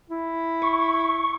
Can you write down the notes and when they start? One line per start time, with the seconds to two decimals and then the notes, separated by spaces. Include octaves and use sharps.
0.10 E4
0.62 C#6